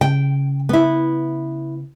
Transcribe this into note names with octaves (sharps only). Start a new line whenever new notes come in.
C#3 G5
B3 E4